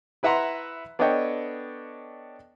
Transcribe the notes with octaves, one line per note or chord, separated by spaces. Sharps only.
E4 B4 E5 F#5 A#5 C6
B3 D4 A4 C#5 D#5 G5